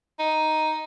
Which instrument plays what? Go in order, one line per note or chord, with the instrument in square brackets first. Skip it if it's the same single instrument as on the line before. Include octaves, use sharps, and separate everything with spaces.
[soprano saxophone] D#4